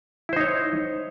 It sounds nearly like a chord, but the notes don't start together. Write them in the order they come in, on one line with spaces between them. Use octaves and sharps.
E4 C5 D#4 C#5